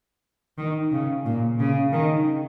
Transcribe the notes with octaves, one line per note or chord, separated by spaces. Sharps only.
D#3
C#3
A#2
C#3
D#3